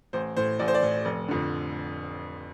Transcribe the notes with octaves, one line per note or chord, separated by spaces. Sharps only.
A1 C5
A2 C5
A1 D5
C5
D5
A2
F1
F2 D3